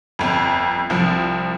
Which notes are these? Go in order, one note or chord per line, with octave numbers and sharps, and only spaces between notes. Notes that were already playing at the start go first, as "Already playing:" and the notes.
G1 F2
C2 F3